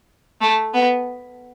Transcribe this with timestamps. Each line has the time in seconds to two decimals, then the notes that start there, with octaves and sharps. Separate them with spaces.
0.41 A3
0.74 B3